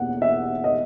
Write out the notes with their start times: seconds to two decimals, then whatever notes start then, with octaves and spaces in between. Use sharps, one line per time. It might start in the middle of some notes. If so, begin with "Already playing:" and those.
Already playing: E2 B2 A#3 F#5
0.22 E5
0.64 D#5